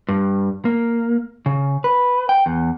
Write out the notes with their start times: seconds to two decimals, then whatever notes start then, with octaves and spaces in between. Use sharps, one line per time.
0.08 G2
0.65 A#3
1.46 C#3
1.84 B4
2.29 G5
2.46 E2